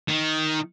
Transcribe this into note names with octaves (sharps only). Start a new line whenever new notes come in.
D#3